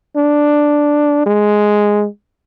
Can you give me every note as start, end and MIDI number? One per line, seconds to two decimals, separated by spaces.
0.16 1.22 62
1.26 2.07 56